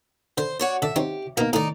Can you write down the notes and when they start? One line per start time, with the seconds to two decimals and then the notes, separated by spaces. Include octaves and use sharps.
0.38 D3 C5
0.59 F#4 C#5 D5
0.82 D3 D4 D5 E5
0.96 C4 D#4 G4 C#5
1.37 B2 A#3 D#4
1.53 A2 D#3 D#4 D5